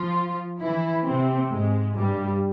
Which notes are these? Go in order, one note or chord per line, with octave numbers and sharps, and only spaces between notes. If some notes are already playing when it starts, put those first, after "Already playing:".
Already playing: F3 F4
E3 E4
C3 C4
G#2 G#3
G2 G3